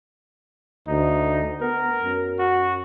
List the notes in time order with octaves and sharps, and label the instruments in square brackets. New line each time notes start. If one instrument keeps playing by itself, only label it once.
[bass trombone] D2 [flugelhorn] D#4
[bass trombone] B3 [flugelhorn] A#4
[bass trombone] F#2
[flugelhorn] F#4